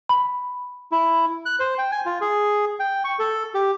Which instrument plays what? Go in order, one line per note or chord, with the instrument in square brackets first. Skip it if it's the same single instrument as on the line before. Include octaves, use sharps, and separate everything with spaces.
[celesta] B5
[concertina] E4
F#6
C5
G5
G#5
F4
G#4
G5
C#6
A4
G4